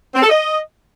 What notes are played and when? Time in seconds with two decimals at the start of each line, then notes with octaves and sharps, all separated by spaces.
0.15 C4
0.22 A4
0.29 D#5